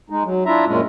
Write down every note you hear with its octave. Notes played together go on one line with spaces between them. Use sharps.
G#3 D#4
F#3
D4 E4 F4 E5 A#5
F#2 A#2 G#3 C#4